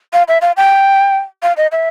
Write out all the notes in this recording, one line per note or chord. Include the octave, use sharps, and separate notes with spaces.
F5
E5
F5
G5
F5
D#5
E5